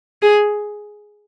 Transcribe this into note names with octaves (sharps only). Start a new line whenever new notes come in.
G#4